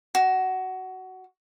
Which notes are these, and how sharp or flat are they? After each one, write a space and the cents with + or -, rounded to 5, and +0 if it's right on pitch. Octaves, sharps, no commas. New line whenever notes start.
F#4 +15